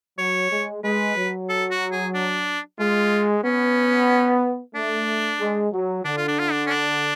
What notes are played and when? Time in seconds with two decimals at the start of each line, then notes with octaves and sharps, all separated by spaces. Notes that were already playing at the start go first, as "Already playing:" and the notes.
0.19 F#3 C#5
0.51 G#3
0.84 G#3 B4
1.16 F#3
1.49 A4
1.71 F#4
1.92 G#4
2.14 D4
2.79 G#3 F4
3.44 B3 C#4
4.75 A3 D4
5.40 G#3
5.73 F#3
6.05 D3 D4
6.17 F4
6.28 D4
6.39 F4
6.52 D4
6.66 C#4
6.70 D4